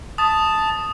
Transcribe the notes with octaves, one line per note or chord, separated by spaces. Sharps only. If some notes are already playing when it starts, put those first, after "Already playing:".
A5 D#6